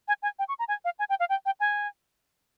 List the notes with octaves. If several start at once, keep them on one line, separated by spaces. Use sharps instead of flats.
G#5
G#5
G5
C#6
A#5
G#5
F5
G#5
G5
F5
G5
G5
G#5